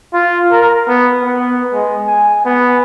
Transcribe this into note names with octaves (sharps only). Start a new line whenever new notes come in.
F4
A#4
B3
B3
G#3
G#5
B3